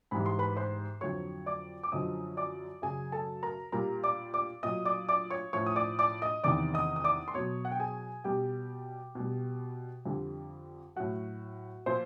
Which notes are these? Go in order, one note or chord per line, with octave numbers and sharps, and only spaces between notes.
G#2 E3 G3 B5
C6
B4 B5
C5 C6
F2 D3 F#3 C#5 C#6
D5 D6
D6
F#2 D3 F3 D#5 D#6
D5 D6
F#2 C#3 F#3 G#4 G#5
A4 A5
A#4 A#5
A#2 G3 A#4 A#5
D5 D6
D5 D6
A#2 F#3 D#5 D#6
D5 D6
D5 D6
C#5 C#6
A2 F3 C#5 C#6
D#6
D5 D6
D5 D6
D#5 D#6
E2 C3 D#3 D5 D6
D#5 D#6
D#6
D5 D6
C6
B2 F#3 C#5 C#6
F#5
G5
G#4 G#5
B2 G3 G4 G5
B2 G3
F2 D3 G3
A2 F#3 F#4 F#5
A#2 F3 C5 C6